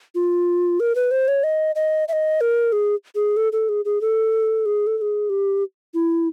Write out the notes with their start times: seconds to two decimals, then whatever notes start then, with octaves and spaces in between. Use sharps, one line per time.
0.15 F4
0.80 A#4
0.95 B4
1.11 C5
1.28 C#5
1.44 D#5
1.75 D#5
2.08 E5
2.13 D#5
2.41 A#4
2.72 G#4
3.15 G#4
3.37 A4
3.52 A4
3.69 G#4
3.85 G#4
4.01 A4
4.66 G#4
4.87 A4
4.98 A4
5.02 G#4
5.30 G4
5.94 E4